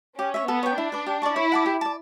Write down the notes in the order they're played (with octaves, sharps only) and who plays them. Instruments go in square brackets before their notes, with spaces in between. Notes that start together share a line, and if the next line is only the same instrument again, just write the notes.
[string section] C#4 [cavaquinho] G4
[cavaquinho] C#5 E5
[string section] B3 [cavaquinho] A4
[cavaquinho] C#5 G5
[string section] D4 [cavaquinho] E4
[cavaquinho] B4 D5
G4
D5 A5 C#6
[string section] E4 [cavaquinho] C#5
[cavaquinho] F#5 A5 D6
G4
D5 A5